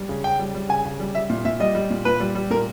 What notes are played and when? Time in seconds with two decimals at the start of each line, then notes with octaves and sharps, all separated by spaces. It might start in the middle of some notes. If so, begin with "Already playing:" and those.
Already playing: G3
0.09 C#3
0.24 C#3 G5
0.39 G3
0.55 G3
0.69 C#3 G#5
0.85 C#3
1.00 G3
1.14 G3 E5
1.30 A#2
1.45 A#2 E5
1.60 G3 D#5
1.75 G3
1.90 A#2
2.05 A#2 B4
2.20 G3
2.35 G3
2.50 A#2 A#4